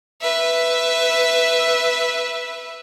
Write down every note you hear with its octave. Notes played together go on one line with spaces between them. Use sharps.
B4 E5